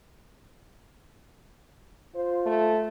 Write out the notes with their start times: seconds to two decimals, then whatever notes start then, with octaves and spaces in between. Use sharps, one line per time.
2.15 F4 C5
2.46 A3